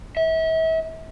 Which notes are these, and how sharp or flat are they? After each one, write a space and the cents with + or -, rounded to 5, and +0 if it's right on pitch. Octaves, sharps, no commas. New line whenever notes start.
E5 -35